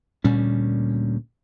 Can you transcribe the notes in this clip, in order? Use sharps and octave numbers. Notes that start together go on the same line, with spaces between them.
D2 A#2 G3 C#4